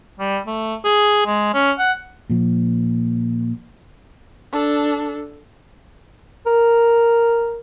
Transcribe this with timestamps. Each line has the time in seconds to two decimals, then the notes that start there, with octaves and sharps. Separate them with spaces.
0.20 G3
0.47 A3
0.85 G#4
1.26 G#3
1.54 C#4
1.79 F#5
2.30 A#2 F3
4.52 D4 A4
6.46 A#4